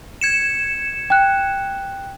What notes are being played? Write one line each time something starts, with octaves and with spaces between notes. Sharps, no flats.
G#6 C#7 E7
G5 F#6